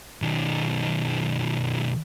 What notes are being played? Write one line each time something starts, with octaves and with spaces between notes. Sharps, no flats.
B1 D#3